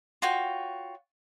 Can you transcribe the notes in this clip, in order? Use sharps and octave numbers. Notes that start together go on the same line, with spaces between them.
F4 F#4 C#5 G5